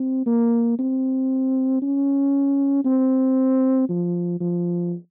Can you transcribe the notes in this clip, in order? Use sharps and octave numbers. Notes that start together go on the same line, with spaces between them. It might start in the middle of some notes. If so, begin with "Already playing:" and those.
Already playing: C4
A#3
C4
C#4
C4
F3
F3